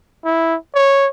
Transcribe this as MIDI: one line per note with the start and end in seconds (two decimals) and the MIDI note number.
0.25 0.56 64
0.75 1.08 73